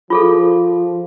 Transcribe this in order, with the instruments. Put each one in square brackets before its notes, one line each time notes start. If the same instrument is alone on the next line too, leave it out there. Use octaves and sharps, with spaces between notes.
[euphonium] F3 [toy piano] F4 G#4 A4